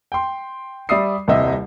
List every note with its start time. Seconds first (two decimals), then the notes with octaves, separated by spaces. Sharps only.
0.12 G5 C6
0.89 G3 D5 E5 D#6 C7
1.28 D#1 C2 C3 G4 D#5 E5